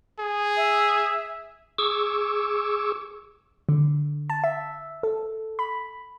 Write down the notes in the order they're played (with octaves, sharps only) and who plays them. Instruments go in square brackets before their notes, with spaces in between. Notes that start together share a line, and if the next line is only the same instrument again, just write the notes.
[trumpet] G#4
[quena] E5
[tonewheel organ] G#4 C#6 D6 E6
[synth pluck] D3
A5
E5
A4
B5